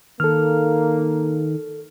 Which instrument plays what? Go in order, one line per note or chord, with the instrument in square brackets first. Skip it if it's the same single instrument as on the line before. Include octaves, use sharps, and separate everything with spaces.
[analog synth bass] D#3 [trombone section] A#3 [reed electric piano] A4 F6